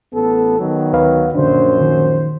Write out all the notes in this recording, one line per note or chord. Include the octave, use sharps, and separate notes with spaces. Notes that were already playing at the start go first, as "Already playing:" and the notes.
A1 B3 A4
D#3 F#3 B3
D2 B4 F5
A#1 F#2 D3 D4 C5
D#3